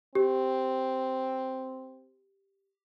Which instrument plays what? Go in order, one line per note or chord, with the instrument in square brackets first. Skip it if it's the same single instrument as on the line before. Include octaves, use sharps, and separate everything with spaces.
[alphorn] C4 [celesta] G4